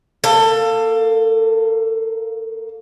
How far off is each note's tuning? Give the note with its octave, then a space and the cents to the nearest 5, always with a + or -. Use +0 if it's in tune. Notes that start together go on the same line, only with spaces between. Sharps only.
A#3 +0 A4 +25